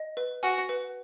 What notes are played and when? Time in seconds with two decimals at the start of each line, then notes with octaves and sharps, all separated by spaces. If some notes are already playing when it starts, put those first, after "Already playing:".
Already playing: D#5
0.17 B4
0.43 F#4 G#5
0.69 B4